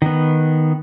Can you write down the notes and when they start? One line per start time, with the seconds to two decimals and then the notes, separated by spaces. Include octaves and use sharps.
0.02 D#3 B3